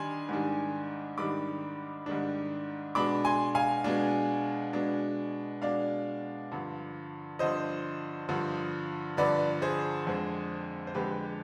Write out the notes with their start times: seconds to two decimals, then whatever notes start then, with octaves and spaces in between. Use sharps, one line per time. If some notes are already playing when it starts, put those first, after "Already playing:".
Already playing: D#3 G3 D4 G#5 C6
0.29 G#2 D#3 G3 D4
1.17 G#2 D#3 G3 D4 B5 D6
2.06 G#2 D#3 G3 D4
2.95 B2 G#3 D4 B5 D6
3.25 G#5 C6
3.55 F5 G#5
3.84 B2 G#3 D4
4.73 B2 G#3 D4
5.62 B2 G#3 D4 D5 F5
6.52 G2 D3 F3
7.39 G2 D3 F3 C5 D#5
8.29 G2 D3 F3
9.17 G2 D3 F3 B4 D5
9.62 G#4 C5
10.07 F2 D3 G#3 C4
10.87 C5
10.95 F2 D3 G#3 C4 G4 B4